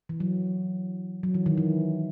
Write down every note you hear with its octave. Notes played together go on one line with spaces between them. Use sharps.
E3
F#3
F#3
E3
D#3
E3